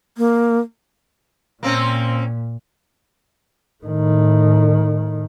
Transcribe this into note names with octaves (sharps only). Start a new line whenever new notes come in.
A#3
A#2 A#3 C4 C#4
A2 D#3